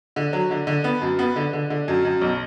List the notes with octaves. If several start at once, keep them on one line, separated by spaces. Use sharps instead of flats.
D3
F#3
D3
D3
B3
F#2
B3
D3
D3
D3
F#2
F#2
B1